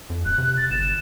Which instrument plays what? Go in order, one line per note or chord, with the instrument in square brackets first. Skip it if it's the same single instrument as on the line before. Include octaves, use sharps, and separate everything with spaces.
[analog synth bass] F2
[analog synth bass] D1 [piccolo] F#6
[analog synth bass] C3
[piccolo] A6
[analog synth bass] G1 [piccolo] E7